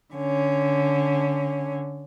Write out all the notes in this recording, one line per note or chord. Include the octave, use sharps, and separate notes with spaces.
D3 C#4